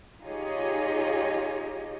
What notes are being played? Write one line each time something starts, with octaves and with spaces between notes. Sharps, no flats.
D#4 F4 G4 G#4 C#5 D#5